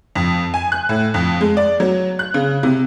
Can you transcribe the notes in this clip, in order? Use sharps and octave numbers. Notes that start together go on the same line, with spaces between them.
F2
G#5
F#6
A2
F2
G#3
D5
F#3
F#6
C#3
C3